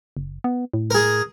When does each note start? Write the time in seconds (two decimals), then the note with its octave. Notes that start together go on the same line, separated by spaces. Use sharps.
0.17 F#1
0.44 B3
0.74 A2
0.91 G#4 A#4